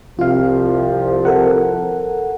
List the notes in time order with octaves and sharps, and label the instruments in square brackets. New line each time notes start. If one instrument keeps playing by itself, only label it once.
[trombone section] C2 C3 F3 [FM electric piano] F4 F5
[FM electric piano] A4 A#4 F#5